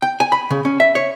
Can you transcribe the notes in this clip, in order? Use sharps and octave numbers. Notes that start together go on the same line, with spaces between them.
G5
G#5
B5
C#3
C#4
E5
C#5